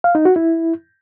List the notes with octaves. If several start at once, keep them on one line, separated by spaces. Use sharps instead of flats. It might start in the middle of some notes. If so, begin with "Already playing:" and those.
F5
D#4
F#4
E4